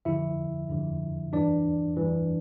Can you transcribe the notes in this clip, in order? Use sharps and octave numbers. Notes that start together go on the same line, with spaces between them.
G2 D3 F3 E4 E5
G2 D3 F3
G2 E3 D4 D5
G2 E3